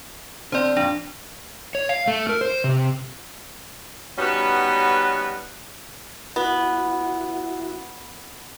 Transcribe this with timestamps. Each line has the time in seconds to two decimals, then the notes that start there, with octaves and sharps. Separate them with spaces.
0.52 D3 C4 C5 D5 C6
0.77 F2 A#2 D4
1.75 C#5
1.89 F5
2.08 A3
2.29 A#4
2.41 C5
2.64 C3
4.18 G3 B3 C#4 D#4 F#4 B4
6.36 B3 E4 F#4